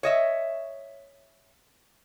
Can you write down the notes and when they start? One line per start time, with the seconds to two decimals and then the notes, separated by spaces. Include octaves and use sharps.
0.03 C#5 D#5 E5